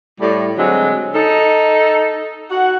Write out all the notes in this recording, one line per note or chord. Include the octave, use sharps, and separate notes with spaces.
A2 G3
D3 F#3 G#3 C4
D#4 A4
F#4 F#5